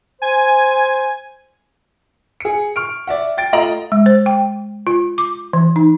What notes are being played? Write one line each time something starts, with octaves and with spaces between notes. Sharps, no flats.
C5 G#5
G#4 C#7
C#6 F6 D7
D5 E5 F#5
G5 A6 D7
A3 F4 D#5 A#5 D7 F#7
G#3
C5
G5
F4
D6
E3
D#4